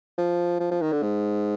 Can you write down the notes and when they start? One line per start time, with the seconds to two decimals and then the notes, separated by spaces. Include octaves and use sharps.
0.18 F3
0.60 F3
0.71 F3
0.82 D#3
0.92 D3
1.03 G#2